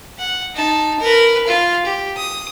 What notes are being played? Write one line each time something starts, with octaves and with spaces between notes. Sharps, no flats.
F#5
D#4 A5
A#4 B4
F4 F5
G4
D#6